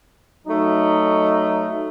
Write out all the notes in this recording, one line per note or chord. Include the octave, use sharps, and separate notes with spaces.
F#3 A3 D#4